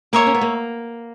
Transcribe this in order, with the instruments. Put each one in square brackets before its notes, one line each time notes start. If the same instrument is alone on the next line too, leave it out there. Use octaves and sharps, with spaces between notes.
[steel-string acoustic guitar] A#3 [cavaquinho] C#5 E5 A#5
[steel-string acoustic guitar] C#4
B3
A#3